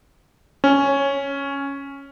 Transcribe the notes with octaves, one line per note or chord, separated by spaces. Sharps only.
C#4